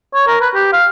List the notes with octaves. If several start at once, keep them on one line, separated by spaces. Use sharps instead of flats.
C#5
A#4
B4
G4
F5